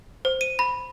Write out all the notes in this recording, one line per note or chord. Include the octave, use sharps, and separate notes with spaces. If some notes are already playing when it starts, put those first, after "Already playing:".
C5
D#7
B5